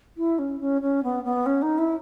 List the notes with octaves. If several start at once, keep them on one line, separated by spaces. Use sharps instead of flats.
E4
C#4
C#4
C#4
B3
B3
C#4
D#4
E4